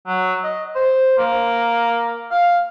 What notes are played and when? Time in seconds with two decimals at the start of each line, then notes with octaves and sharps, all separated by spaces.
0.07 F#3
0.43 D#5
0.76 C5
1.18 A#3
2.31 F5